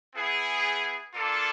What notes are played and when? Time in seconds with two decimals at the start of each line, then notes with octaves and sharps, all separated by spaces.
0.14 B3 E4 G#4
1.14 A#3 D4 F4 A4